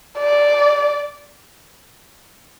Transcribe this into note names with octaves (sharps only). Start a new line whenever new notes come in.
D5